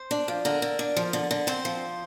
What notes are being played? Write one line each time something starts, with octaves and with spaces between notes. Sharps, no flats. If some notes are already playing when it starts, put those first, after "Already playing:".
Already playing: C5
D4
F3
D3 A#4
D3
D4
F3
D3
D3
C4 C5
F3